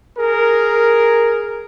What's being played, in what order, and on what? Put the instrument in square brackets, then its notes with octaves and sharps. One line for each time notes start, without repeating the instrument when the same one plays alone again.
[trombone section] G#4 A#4